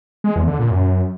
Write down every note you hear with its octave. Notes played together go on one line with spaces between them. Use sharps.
G#3
E2
D3
A#2
F#2